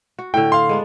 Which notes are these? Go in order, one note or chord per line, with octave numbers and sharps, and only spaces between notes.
F#4
A2 D3 G5
F5 C6
G#3 B3 D4